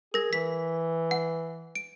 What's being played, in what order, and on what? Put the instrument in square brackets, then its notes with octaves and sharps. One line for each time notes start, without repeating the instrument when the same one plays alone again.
[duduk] G#4 [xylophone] A#4 A#6
[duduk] E3 [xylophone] B6
[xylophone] F#5
D7